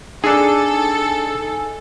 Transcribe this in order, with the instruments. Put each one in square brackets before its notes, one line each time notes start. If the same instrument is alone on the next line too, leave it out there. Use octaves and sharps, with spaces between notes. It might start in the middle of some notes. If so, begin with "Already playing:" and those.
[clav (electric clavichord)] D4 G#4 [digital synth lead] D#4 [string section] A4 [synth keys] G#5 E6